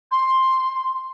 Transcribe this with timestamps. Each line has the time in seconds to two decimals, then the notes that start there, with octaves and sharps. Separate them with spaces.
0.12 C6